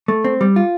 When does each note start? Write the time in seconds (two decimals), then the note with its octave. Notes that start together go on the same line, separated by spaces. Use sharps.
0.08 A3
0.24 C4
0.41 G3
0.56 F4